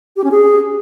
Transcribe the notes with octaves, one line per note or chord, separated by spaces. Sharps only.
G4
C#4
G#4